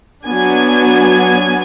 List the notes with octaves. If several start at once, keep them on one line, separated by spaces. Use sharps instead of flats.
F#3 B3 D4 G#5